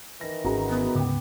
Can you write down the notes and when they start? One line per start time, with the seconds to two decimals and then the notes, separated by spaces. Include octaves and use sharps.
0.21 D#3 E3 A#6
0.44 G#1 C#4 F#4 G#4 A#5
0.69 B3
0.95 D2 G#2 C#3 G5 D6